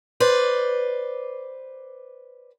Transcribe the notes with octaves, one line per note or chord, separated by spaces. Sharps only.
B4 C5 D5